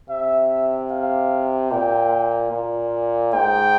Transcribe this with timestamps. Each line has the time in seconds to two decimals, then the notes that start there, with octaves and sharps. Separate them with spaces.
0.09 C3 E5
0.91 F5
1.72 A#2 G5
2.52 A#2
3.33 G#2 G5